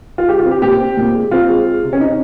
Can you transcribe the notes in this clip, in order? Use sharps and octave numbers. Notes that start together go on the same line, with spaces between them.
F4
G#3 G4
F4
C4
G4
A#2 G4
C4
A#2
G#3
C4 F4
G#3
G#3
C3
C#4
C4 D#4